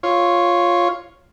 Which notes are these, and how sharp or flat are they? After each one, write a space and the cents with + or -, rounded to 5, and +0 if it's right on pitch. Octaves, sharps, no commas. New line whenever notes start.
F4 +0 C#5 +0